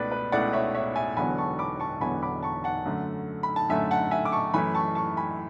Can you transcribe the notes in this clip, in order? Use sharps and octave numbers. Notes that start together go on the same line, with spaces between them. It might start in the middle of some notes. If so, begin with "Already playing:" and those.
Already playing: C#2 B2 A3 B4 D5
B4
C#2 B2 A3 E4 D5 F#5
C#5 E5
C#5 E5
E5 G#5
E1 E2 D3 F#3 B3 G#5 B5
A5 C#6
B5 D6
A5 C#6
E1 E2 D3 F#3 B3 G#5 B5
B5 D6
A5 C#6
F#5 A5
F#2 D3 A3
B5
A5
F#2 D3 A3 E5 G#5
F#5 A5
E5 G#5
D6
A5 C#6
F#2 E3 A3 E4 G#5 B5
A5 C#6
A5 C#6
G#5 B5